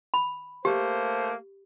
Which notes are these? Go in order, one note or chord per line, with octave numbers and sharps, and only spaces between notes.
B5
A3 A#3 G4 C5